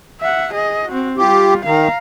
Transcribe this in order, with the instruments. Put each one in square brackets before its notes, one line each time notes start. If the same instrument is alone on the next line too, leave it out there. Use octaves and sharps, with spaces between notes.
[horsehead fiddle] E5 F#5
G#4 D#5
C4 F#4
[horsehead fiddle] G3 F4 [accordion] G4
[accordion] D#3 [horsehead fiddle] F5 A#5